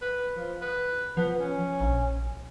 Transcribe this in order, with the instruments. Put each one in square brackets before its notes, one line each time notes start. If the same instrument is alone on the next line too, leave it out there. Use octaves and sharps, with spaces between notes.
[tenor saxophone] B4
F3
B4
[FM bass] F3 [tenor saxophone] B3
[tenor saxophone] C#4
[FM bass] A#1